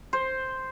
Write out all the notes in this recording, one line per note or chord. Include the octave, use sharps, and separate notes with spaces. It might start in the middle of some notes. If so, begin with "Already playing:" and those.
C5